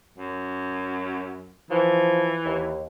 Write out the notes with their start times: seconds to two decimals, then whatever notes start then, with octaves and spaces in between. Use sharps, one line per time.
0.18 F#2
1.71 E3 F3
2.45 D#2